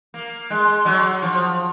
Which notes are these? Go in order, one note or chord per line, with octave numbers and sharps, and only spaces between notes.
A#3
G#3
F#3
F3